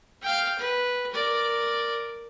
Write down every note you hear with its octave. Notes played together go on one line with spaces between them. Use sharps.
F5 G5
B4
A#4 D5